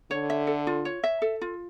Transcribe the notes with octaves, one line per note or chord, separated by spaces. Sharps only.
D3 C#5
E5
A4
F4
C#5
E5
A4
F4